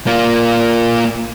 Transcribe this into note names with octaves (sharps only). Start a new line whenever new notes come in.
A#3 F4